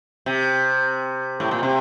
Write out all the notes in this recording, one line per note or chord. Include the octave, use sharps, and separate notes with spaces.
C3
A2
A#2
C3